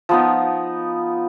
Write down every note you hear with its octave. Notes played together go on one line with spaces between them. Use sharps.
F3 B3 D#4